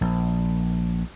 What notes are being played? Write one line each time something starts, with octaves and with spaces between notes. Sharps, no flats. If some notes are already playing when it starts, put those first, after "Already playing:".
A#1